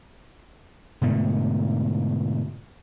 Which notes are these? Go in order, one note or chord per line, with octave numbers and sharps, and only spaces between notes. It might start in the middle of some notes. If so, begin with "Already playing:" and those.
G#2 B2 D3 A3